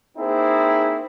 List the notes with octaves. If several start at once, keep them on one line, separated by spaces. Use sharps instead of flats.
A#3 C4 D#4 E4 G#4 C5